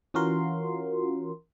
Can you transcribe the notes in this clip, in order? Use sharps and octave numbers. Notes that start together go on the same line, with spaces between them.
E3 C#4 F4 F#4 A#4 C6